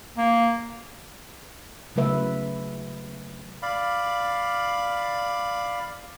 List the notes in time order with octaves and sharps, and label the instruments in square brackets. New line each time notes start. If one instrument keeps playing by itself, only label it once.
[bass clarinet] A#3
[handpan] C#3 F#3 A3 B4 E5
[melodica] D5 F5 B5